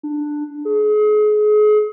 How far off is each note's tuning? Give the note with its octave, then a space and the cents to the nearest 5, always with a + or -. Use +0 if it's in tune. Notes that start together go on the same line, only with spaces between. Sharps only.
D4 +10
G#4 +35